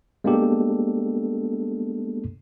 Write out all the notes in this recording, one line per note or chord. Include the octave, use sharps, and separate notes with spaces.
G#3 A#3 B3 D4 G4 A4